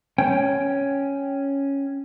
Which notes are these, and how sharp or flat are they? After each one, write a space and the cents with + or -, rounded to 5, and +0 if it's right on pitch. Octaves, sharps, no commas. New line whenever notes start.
C#4 +0 G5 +0